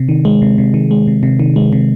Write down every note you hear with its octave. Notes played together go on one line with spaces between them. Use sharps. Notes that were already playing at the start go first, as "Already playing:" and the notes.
Already playing: C3
D#3
G#3
C3
C3
D#3
G#3
C3
C3
D#3
G#3
C3